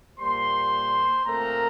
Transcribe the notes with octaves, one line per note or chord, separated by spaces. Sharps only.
A#2 G3 A#3 C5 C6
A#2 A3 C4 A#4 A#5